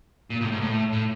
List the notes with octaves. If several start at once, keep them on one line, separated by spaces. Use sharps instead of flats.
A#2
A2
G#2
A2
A2